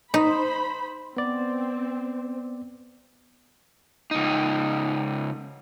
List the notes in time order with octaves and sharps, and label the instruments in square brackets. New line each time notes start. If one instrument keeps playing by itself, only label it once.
[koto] D#4 [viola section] C5 B5
[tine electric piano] B3 D5 [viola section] C4
[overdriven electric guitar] C#2 D#4